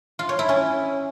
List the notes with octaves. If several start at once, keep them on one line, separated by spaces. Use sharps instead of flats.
F4
C#5
E4
C#4